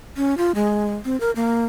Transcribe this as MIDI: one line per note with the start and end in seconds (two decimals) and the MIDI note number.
0.17 0.37 61
0.37 0.52 65
0.55 0.94 56
1.05 1.19 60
1.20 1.31 70
1.36 1.66 58